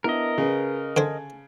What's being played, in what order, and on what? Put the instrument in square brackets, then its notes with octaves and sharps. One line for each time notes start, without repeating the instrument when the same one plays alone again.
[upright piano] B3 D4 E4 [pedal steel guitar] A#4 D#5
[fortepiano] C#3 [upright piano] G#4 B4
[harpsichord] D3 C5 [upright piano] G#5 A5 G#6